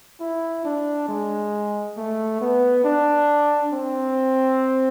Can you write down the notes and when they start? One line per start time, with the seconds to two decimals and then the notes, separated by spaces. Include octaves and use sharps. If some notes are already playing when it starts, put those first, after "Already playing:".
0.20 E4
0.65 D4
1.08 G#3
1.97 A3
2.41 B3
2.84 D4
3.73 C4